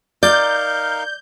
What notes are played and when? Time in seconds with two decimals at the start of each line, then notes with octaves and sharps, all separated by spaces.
0.23 D#4 A#4 D5 F5 G6